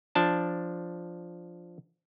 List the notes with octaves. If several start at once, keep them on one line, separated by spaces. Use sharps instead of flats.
F3 D4 A5